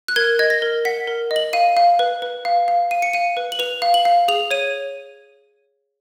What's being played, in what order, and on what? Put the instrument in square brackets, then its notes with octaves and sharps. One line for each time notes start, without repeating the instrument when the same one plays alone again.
[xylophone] F#6
A#4 G#6
D#5 G#6
A#6
A#4
F#5 B6
A#4
D#5
F#7
F5 D#7
F5
B4
B4
F5
F5
F5 D#7
C#7
F5 D#7
B4
F#7
B4 F7
F5
F#7
F5
G#4 F7
C#5 D#7